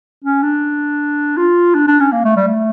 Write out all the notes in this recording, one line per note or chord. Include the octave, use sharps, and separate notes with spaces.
C#4
D4
F4
D4
D4
C#4
A#3
A3
G3
A3